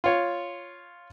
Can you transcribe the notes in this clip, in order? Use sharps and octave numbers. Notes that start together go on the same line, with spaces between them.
F4 C#5